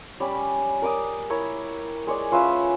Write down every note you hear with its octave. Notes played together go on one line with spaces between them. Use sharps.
G3 C#4 D5 B5
A#4 D5 D6 D#6
E4 A#4 C#5
G#3 C#5 D5
C#4 F4 B4 E5